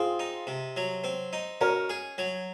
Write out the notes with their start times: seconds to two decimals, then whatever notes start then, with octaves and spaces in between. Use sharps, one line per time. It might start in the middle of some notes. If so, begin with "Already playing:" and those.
Already playing: C4 F4 G#4
0.19 D#4
0.47 C3
0.76 F#3
1.04 C4
1.33 D#4
1.61 C#4 F#4 A#4
1.90 G#4
2.18 F#3